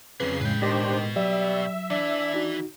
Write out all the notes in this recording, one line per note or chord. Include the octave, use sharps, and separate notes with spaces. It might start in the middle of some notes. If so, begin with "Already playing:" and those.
F2 C#3 F#3 C4 D4 B4 C7
A2 G#3 B4 G5
B2 D#3 D4 G4 C5
F#3 G3 E5
E3 D4 E4
D#4 F#4